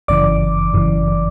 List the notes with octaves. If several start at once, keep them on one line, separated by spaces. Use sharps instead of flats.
G1 F#2 C#3 E3 D5 D6
G1 F#2 C#3 E3